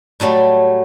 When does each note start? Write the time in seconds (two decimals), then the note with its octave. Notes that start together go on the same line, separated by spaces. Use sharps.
0.20 A2 F#3 G3 A3